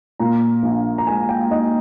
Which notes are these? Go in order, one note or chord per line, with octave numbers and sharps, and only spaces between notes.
A#2 A#5
A#1
A#5
G#3 G#5
G5
D#4 D#5